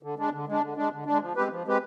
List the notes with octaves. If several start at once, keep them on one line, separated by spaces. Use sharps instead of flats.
D3
G#3 D4
D3
G#3 D4
D3
G#3 D4
D3
G#3 D4
F3
G#3 C4 G4 B4
F3
G#3 C4 G4 B4